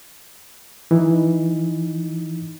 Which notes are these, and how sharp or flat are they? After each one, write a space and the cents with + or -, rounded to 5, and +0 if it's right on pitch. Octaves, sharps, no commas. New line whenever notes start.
E3 +0 D#4 +0